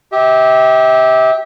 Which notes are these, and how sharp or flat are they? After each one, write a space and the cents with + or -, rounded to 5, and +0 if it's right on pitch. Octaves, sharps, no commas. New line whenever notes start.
G4 +0 E5 -35